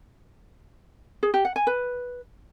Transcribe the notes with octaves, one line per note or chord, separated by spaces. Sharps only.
G#4
G4
F#5
G#5
B4